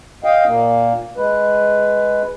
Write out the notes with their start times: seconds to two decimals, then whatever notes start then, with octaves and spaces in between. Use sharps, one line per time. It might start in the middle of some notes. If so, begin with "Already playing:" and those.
0.24 D#5 F5 G5
0.47 A#2 A#3
1.17 G#3 B4